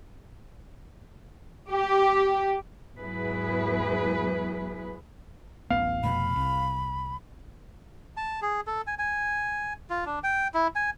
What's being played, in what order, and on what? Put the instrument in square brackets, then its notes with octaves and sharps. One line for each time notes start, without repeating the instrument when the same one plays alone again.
[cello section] G4
E2 G#2 F#3 E4 G#4 B4
[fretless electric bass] D1 A1 B3 [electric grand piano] F5
[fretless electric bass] F1 B2 [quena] B5
[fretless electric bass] C2
[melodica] A5
G#4
A4
G#5
G#5
F4
D4
G5
E4
G#5